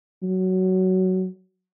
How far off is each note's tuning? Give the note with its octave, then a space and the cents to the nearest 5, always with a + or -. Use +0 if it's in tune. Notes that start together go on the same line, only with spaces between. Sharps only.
F#3 +10